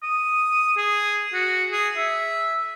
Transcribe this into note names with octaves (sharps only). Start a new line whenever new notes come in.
D#6
G#4
F#4
G#4
E5